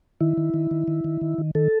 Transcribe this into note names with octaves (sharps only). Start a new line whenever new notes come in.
D#3 E4
D#3
D#3
D#3
D#3
D#3
D#3
D#3
D#3 A4